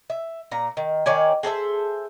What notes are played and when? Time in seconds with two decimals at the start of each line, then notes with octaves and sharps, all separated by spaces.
0.10 E5
0.52 A#2 A#5
0.77 D#3
1.06 D#3 C#5 D5 G#5
1.43 G#4 A4 C5 E5